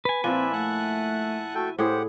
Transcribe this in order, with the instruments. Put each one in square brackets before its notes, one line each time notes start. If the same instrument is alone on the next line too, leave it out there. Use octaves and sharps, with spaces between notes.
[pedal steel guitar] B4 G#5
[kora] A#2 F3 [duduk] C4 [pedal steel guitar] E4 G#5 [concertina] F4 B4 D5
[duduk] A3 [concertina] F#5 A5 F#6
[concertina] A3 A4 G5 [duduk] F#4
[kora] A2 G#4 [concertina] G4 F#5 [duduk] C5